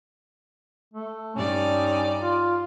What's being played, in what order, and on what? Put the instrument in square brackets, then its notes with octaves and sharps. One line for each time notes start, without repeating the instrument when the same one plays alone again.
[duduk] A3
[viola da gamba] G2 D#4 D5 [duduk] C#4
[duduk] F4